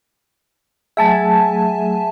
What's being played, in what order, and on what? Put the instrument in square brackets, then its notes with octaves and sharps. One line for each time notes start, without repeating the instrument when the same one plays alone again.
[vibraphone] F#3 A3 G#4 [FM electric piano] E5 G#5 A5